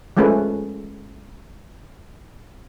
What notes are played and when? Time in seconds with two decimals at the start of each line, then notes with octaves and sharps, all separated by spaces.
0.17 F3 G#3 A3 C#4 B4